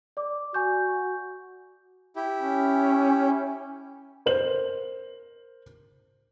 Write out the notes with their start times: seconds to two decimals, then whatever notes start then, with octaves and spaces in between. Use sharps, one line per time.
0.17 D5 D6
0.54 F#4 G#5 C#6 G6
2.16 E4 G4
2.39 C#4
4.26 A#4 C5 F#7